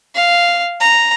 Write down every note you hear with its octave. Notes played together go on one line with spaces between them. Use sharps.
F5
A#5